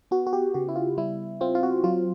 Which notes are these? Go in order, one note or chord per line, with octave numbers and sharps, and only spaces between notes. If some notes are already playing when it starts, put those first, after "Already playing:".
B3 F#4
F#4
G4
C#3 F#4
E4
F4
G3 E4
C4 F4
F4
F#4
F#3 F4